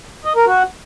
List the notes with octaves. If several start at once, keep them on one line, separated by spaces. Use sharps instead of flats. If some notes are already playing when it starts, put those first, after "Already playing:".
D#5
A#4
F#4